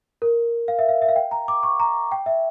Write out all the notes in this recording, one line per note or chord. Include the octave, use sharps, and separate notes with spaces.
A#4
F5
E5
F5
E5
F5
G5
A#5
D6
C#6
A#5
G5
E5